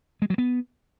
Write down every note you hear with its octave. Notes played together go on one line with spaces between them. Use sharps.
G#3
F#3
B3